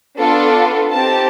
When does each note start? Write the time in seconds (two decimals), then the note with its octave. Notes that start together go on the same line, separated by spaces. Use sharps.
0.18 B3 D4 F4 A4
0.92 C4 D#4 G4 A5